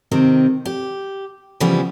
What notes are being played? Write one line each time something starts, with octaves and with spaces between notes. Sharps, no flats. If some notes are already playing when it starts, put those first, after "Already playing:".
C3 D#3 C4
G4
C#3 E3 F3 G3 B3